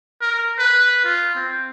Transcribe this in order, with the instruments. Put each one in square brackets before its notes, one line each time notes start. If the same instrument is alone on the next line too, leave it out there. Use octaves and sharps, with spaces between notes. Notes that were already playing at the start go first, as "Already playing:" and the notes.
[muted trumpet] A#4
B4
F4
C4